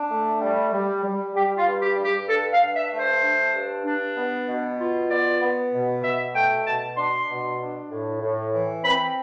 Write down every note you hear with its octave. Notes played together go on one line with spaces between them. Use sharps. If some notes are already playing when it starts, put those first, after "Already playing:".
Already playing: D4
A3
G3
G3
G3
G3 G4
F4
G2
G4
G2
G4
D4 A4
F5
G2
E5
A3
C5
D4
G2
D4
B3
B2
F4
B3 D5
B3
B2
B2 E5
A3 G5
B2 A5
D4 C6
B2
D4
A2
A2
E3
C4 B5